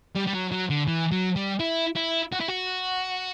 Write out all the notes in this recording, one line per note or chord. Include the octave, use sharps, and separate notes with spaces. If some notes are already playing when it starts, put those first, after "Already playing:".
G3
G3
F#3
F#3
D3
E3
F#3
G3
E4
E4
F#4
E4
F#4